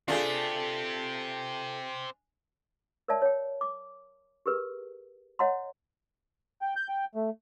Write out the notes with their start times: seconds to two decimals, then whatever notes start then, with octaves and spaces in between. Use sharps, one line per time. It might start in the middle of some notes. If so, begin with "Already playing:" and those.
0.08 A3 C4 D4 F4 G4 G#4
3.08 A#4 C#5 D5 E5 A5
3.22 C#5 G5
3.61 D6
4.46 G4 G#4 A#4 B4
5.39 C#5 D#5 F#5 A#5 C6
6.62 G5
6.76 G6
6.89 G5
7.15 A3